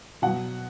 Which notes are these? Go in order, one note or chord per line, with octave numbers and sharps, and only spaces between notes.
B2 F#3 F#5